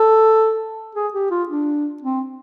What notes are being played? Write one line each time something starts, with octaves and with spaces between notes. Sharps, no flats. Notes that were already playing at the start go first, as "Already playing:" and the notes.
Already playing: A4
G#4
G4
F4
D4
C4